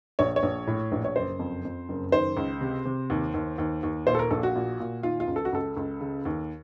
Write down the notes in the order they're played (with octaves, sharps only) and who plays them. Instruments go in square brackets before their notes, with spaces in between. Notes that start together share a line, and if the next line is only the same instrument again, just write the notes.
[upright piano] A#1 C#5
C#5
A#1
A2
A#1
C#5
F#1 C5
F2
F2
F#1
D#3 C5
C#2
C3
C3
D#2
D#2
D#2
D#2
A#2 C5
A4
A#4
A#1 A4
F#4
A#2
A#2
D#3 F4
F4
C#2
A4
F#4
C#2 A4
C#2
C#3
D#2